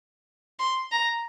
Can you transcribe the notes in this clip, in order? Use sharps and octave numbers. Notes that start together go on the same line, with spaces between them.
C6
A#5